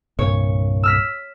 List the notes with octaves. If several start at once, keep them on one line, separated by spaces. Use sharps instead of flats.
C2 G2 A#2 C#5
E6 F6 B6